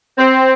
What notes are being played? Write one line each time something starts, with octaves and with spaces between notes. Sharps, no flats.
C4